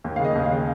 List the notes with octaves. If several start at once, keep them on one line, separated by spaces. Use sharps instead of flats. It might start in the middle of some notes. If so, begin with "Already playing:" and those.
D#2
C#3 F5
D#5
D#2
F5
C#3